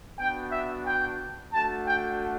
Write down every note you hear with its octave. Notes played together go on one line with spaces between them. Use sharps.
B3 D4 F#4 G5
E5
G5
A3 D4 F#4 A5
G5